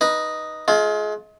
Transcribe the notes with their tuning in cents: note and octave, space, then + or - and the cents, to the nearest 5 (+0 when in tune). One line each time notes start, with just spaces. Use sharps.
D#4 +0 B4 -20
G#3 +35 F4 +5